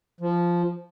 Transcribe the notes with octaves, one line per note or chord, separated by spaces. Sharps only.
F3